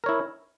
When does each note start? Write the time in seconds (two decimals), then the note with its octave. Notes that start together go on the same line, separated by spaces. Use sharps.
0.04 A#4
0.06 C#5
0.09 E4